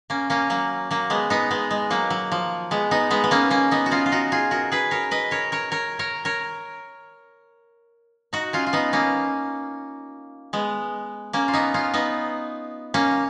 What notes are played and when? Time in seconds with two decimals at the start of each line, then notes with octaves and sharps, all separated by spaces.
0.10 A#3 C#4
0.30 A#3 C#4
0.50 F#3 A#3
0.91 F#3 A#3
1.10 G#3 B3
1.30 B3 D#4
1.51 G#3 B3
1.71 G#3
1.90 F#3 A#3
2.10 F#3
2.32 F3
2.71 G#3 B3
2.91 B3 D#4
3.11 G#3 B3
3.24 B3
3.31 A#3 C#4
3.50 A#3 C#4
3.71 B3 D#4
3.86 F#4
3.91 C#4 F4
4.06 F4
4.12 D#4 F#4
4.32 F4 G#4
4.51 F#4 A#4
4.72 G#4 B4
4.91 A#4 C#5
5.11 B4 D#5
5.31 A#4 C#5
5.52 A#4 C#5
5.72 A#4 C#5
5.99 A#4 C#5
6.25 A#4 C#5
8.33 D#4 F#4
8.53 C#4 F4
8.67 F4
8.73 B3 D#4
8.93 A#3 C#4
10.53 G#3 B3
11.33 A#3 C#4
11.48 F4
11.53 B3 D#4
11.74 C#4 F4
11.94 B3 D#4
12.94 A#3 C#4